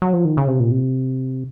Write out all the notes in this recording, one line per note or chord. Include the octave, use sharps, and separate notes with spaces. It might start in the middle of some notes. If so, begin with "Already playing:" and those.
F#3
F3
D#3
C#3
C3
A#2
C3